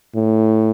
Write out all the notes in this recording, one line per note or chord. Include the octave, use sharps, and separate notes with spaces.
A2